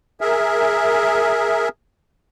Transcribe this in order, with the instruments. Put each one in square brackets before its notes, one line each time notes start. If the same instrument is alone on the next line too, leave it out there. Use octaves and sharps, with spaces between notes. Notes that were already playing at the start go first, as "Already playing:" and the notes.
[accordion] G#4 A#4 E5